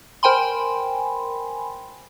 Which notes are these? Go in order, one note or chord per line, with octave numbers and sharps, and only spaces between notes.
A#4 C5 G5 G#5 B5 C6